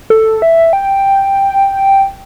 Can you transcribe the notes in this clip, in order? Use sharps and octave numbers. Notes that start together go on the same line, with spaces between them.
A4
E5
G5